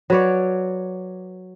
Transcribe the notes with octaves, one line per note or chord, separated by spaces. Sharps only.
F#3 B4 C#5 D5